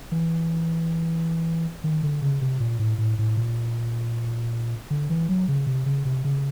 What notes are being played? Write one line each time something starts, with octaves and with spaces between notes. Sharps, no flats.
E3
D#3
D3
C#3
C3
A#2
A2
A2
A2
A#2
D3
E3
F#3
C#3
C3
C#3
C3
C#3